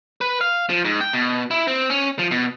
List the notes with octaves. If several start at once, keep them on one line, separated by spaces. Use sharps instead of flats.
B4
F5
F3
G#2
G5
B2
E4
C4
C#4
F3
B2